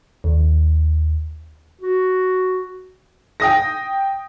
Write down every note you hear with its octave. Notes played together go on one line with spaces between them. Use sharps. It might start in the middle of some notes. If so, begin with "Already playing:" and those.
D#2
F#4
G5 D#6 A#6